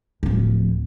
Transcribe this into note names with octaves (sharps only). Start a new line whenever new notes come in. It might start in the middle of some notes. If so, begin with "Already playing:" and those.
D1 F3